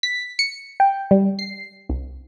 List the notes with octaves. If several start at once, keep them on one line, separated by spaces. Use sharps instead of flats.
B6
C#7
G5
G3
C7
C2